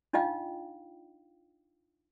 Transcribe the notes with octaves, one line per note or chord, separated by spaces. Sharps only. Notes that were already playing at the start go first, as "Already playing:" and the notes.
D4 D#4 F4 D#5 F5 G5